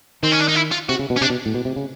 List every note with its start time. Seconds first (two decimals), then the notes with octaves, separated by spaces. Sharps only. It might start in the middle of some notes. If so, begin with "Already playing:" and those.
0.23 D#3 C4
0.31 C#4
0.40 D4
0.48 D#4
0.55 E4
0.72 F4
0.89 C3 F#4
0.99 C#3
1.10 B2
1.16 C#4
1.21 C3 D4
1.30 B2
1.46 A2
1.54 B2
1.65 C3
1.76 C#3